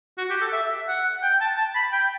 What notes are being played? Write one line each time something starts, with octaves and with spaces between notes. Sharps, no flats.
F#4
G4
A4
E5
F#5
G5
A5
A5
B5
G5